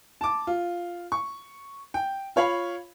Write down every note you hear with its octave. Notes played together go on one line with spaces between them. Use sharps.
A5 D6
F4
C#6
G5
F4 C#5 F5 B5